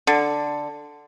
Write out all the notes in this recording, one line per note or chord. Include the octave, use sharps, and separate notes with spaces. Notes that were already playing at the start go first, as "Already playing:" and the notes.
D3